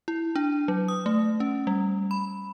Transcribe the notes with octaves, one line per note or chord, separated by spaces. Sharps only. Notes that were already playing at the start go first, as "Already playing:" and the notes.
E4
D4
F#3
D#6
A3
C#4
G3
B5